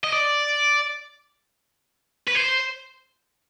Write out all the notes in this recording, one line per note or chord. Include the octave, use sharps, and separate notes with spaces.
D#5
D5
B4
C5